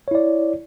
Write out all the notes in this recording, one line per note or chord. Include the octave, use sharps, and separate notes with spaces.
E4 C#5 D5